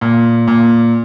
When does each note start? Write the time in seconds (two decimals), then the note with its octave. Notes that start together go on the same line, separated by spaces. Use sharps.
0.01 A#2
0.48 A#2